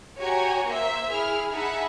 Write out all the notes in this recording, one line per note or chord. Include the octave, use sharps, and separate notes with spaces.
F#4 G4 C#5 G#5 A#5
A#3 C5 E5
E4 G#4 F6
D#4 G#4 E5 F#5 A5 B5